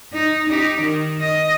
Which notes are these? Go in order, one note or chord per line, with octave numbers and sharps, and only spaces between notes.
D#4
D#4 G4
D#3
D#5